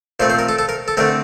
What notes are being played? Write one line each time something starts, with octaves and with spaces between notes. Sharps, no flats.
A#2 A3 C4 C5
C5
A#4
A4
A4
A#4
A4
D3 A3 C4 A#4